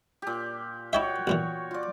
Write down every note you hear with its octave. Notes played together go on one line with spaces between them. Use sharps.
A#2 G4
E4 F#4 C#5 D#5 E5 G5
B1 A#2 E3
F4 D5